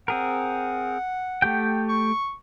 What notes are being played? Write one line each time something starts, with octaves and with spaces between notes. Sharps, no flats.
C4 G#4 A#4 F#5
A3 G4 G5
C#6